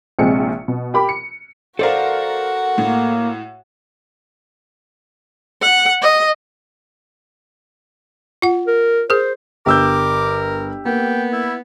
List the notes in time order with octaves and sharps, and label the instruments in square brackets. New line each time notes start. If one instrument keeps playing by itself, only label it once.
[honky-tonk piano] A#1 C3 G#3 C4 C#7
B2
G4 A#4 B5 D6
C#7
[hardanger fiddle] F#4 F#5 [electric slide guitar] A4 D5 F5 [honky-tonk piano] A#4 C5
[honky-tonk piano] A2 [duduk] A#3
[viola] F#5
D#5
[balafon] F4 F#5
[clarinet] A#4
[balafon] G#4 A#4 [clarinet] C5
[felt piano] G1 [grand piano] G4 E6 G6 [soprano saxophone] A#4 [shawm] D6
[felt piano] A#3 [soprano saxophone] B3 [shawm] G5
[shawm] E4